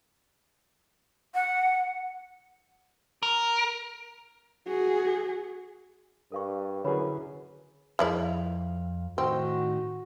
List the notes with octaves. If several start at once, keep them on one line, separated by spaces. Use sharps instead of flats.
F#5
A#4
F#4 G#4
G2 A#4 F5 C#6
F#2 D3 E4 G#4 B4 C#5 B5
F2 F3 G#3 E4 D5 F5
A2 D#3 C4 D#4 F#4